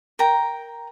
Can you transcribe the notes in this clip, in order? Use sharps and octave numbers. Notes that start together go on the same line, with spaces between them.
A#4 G5 A#5